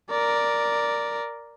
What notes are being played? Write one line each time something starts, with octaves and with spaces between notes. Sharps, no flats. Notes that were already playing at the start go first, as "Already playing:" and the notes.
A#4 D5